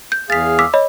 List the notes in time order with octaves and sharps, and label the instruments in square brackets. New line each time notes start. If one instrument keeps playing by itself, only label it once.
[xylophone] G6
[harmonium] E2 G#4 F5 [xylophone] A6 B6
[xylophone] D6 E6 B6
C#5 D#5 B5